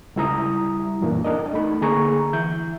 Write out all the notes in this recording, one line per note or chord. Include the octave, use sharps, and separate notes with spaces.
C#2 G3 E4 E5 A#5 D#6
F#2 A#2 E3 A#3 D4
D4 A#4 D#5
A3 D#4 B5
D3 A#3 G#4 A#5 C#6
E3 E5 G6